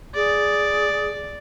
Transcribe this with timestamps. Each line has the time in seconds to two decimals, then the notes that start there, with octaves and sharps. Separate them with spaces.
0.15 G#4 D5